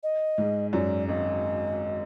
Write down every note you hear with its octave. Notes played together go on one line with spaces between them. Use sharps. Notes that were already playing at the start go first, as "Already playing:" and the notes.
D#5
G#2 G#3
F#2 F#3 D5
G#1 G#2 D#5